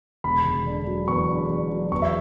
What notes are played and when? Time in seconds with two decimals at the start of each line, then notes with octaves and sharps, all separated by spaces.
0.24 E1 B5
0.45 E1
0.66 D3
0.87 F#3
1.08 E2 C#6
1.29 D3
1.50 D3
1.71 F#3
1.92 E2 C#6
2.02 E5